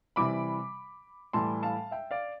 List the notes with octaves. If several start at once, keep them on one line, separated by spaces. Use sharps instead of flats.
C3 E3 G3 B5 D6
A2 E3 G3 A5 C6
F5 A5
E5 G5
D5 F5